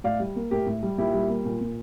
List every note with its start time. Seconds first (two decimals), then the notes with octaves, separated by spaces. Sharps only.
0.04 A2 D5 F5
0.20 G3
0.36 A#3
0.51 A2 G4 A#4
0.67 A2
0.83 G3
0.98 A#2 E4 G4
1.14 G3
1.29 A#3
1.45 A#2
1.61 A#2